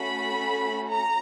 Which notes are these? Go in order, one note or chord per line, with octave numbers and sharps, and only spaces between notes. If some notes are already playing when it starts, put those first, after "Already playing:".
Already playing: A3 C#4 F#4 A4 B5
A#5